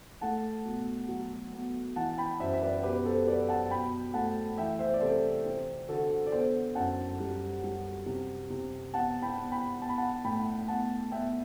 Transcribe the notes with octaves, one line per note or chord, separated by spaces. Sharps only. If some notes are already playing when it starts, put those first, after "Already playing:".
A3 F#5 A5
B2
F#3
B3
E3 F#5 A5
G5 B5
F#2 C5 E5
E5
B4 D5
B2 G4 B4
A4 C5
F#3 B4 D5
F#5 A5
B2 G5 B5
A3 F#5 A5
E3 E5 G5
C5 E5
D5
C3 A4 C5
C4
D3 F#4 A4
D5
B3 A4 C5
F#2 F#5 A5
G3
G3
C3
C3
B3 F#5 A5
G5 B5
B3
G5 B5
B3 A5
B5
F#5 A5
A2 G5 B5
B3 F#5 A5
B3 E5 G5